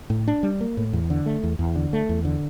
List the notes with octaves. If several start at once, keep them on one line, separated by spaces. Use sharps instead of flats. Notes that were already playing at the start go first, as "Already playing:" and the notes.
A2
D4
G3
A#3
A2
E2
D3
A3
E2
E2
D3
A3
E2
D3